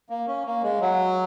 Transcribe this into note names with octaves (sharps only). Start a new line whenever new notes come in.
A#3
C#4
A#3
G#3
F#3